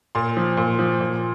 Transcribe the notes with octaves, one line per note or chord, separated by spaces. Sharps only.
A#2 C6
F3
A#2
F3
A#2